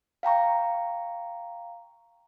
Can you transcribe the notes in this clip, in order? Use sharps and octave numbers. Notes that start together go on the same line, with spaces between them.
F5 G5 A#5 C#6